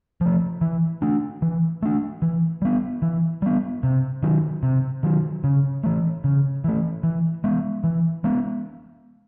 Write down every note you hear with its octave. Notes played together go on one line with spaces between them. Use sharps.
F3 A3
E3
A3 D4
E3
A3 D4
E3
G3 B3
E3
G3 B3
C3
D#3 F#3
C3
D#3 F#3
C#3
E3 A3
C#3
E3 A3
E3
G#3 B3
E3
G#3 B3